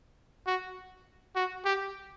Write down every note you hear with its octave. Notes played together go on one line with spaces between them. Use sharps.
F#4
F#4
G4